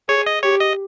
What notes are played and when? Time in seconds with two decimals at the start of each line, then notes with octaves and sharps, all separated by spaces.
0.09 G#4 C#5
0.26 D#5
0.43 G4 C#5
0.60 D#5